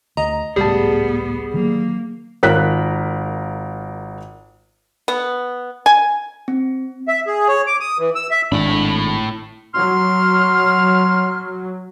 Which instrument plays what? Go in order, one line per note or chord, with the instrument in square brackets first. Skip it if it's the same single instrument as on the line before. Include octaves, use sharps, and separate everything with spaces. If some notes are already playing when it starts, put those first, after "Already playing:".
[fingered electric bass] D2 [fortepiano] D#5 [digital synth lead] A#5
[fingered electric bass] G#1 C#2 A2 [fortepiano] G3 A5 [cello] B3 [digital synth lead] G#4
[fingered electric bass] D3 D#3 F#3 [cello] A#3
[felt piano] G#1 F4 A#4 F#6 B6
[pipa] B3
G#5
[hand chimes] C4
[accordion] E5
G#4
C#5
D6
D#6
E3
E6
E5
[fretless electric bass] G#1 D4 [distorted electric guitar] A2 B5
[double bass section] F#3 [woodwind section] C6 F6